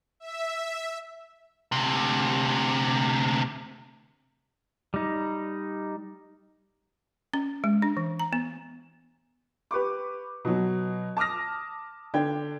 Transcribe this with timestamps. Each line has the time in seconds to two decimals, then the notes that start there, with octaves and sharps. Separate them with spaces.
0.20 E5
1.72 D2 C3
4.94 G3 D#4
7.34 C#4
7.64 G#3
7.82 D4
7.97 E3
8.19 A#5
8.33 B3
9.71 G4 B4 C#6 D6
10.45 B2 F#3
11.17 A5 D6 D#6 F6 A#6
12.14 D3 D4 G5 G#6